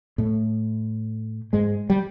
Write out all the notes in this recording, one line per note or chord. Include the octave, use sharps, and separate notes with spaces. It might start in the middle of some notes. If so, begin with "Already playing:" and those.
A2 A3
G#2 G#3
G3